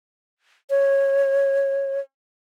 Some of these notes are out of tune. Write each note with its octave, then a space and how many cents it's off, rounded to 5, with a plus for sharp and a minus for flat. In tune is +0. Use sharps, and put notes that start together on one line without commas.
C#5 -15